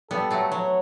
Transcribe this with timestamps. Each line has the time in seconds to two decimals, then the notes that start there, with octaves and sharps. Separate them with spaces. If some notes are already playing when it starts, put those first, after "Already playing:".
0.10 G3 B3 A4
0.31 F#3 A3
0.51 F#3 C#5